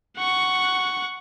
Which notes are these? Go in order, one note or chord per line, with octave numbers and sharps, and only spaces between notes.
F#5 C#6